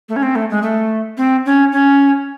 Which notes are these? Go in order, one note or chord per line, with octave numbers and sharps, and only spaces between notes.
A3
C#4
C4
A3
G#3
A3
C4
C#4
C#4